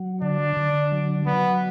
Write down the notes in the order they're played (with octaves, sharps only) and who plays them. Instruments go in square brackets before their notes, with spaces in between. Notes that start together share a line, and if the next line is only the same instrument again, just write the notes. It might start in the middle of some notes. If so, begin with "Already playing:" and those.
Already playing: [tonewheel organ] F#3
[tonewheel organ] D3 [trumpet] D4
[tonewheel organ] D3
F#3
[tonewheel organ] F#3 [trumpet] B3